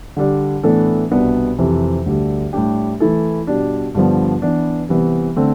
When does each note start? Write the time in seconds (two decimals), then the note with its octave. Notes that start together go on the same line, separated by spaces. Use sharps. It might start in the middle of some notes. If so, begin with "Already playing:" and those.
0.17 D3 G3 D4
0.63 A2 E3 B3 D4 A4
1.11 C2 B2 B3 D4
1.59 F2 C3 E3
2.06 D2 D3 G3
2.53 A2 G3 D4 G4
3.00 E3 A3 E4 A4
3.47 B2 G3 D4
3.95 G2 D3 F3 B3
4.42 E3 B3 D4
4.89 C3 E3 G3 B3
5.36 D3 A3 C4